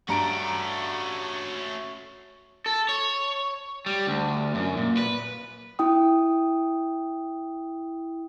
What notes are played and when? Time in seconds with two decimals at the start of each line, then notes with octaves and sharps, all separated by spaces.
0.08 G2 A3 C#4 F#4 A#5 D7
2.66 A4
2.89 C#5
3.86 G3
4.07 D2
4.55 F#2
4.77 A#2
4.97 B4
5.79 E4 G5 D#6